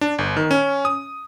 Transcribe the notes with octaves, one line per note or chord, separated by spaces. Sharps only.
D4
G1
D#3
C#4
D#6